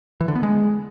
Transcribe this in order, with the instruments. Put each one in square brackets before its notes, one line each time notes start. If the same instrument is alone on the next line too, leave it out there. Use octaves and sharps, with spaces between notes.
[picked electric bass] E3
D3
B3
G#3